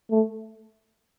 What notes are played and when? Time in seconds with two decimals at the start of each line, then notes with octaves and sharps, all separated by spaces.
0.11 A3